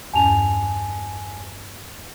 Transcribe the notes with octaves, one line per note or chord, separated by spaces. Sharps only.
E2 G2 C#4 G#5 A5 F7